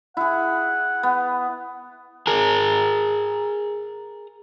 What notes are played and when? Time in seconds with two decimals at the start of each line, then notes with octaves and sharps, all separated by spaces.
0.17 E4 G#4 F#5
1.03 B3
2.27 G#4 A#4